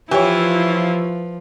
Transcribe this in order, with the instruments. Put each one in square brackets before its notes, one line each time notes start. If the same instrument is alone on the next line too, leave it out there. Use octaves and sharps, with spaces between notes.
[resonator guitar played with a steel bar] E3 [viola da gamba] F3 [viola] E4 F4 [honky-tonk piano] G4 C#5